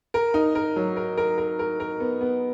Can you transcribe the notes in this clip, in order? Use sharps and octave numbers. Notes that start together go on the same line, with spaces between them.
A#4
D#4
A#4
F#3
A#4
A#4
A#4
A#4
A#4
B3
B3